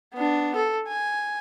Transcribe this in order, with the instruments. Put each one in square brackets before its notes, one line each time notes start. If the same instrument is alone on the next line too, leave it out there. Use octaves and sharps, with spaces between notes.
[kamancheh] B3 D4
A4
G#5